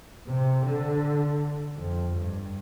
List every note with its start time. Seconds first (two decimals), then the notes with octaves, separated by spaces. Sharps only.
0.27 C3
0.65 D3
1.77 F2
2.15 G2